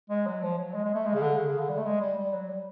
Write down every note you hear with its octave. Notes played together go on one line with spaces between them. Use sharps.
G#3
F#3
F3
F#3
G#3
G#3
A3
G#3
C#3
D3
C#3
C#3
D3
G3
A3
G#3
G3
G3
F#3
G3